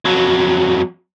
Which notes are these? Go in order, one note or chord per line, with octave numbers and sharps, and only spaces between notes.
F2 F#3